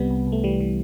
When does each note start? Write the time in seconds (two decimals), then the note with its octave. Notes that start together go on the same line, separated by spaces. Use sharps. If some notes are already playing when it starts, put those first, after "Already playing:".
Already playing: C2 C3 G3 B3
0.11 C2
0.27 C2
0.32 A3
0.44 E3 G3
0.60 E3